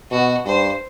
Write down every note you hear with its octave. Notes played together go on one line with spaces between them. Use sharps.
B2 F#4
G2 C5